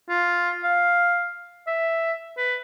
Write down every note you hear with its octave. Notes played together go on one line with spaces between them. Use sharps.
F4
F5
E5
B4